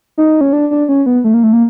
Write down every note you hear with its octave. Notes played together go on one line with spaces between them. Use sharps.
D#4
C#4
D4
D4
C#4
B3
A3
A#3
A3
A#3